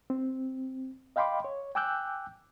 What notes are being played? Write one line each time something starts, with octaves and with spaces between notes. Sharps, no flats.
C4
D#5 F5 G5 B5 C6 D6
C#5
G5 G#5 D6 E6 F#6 G6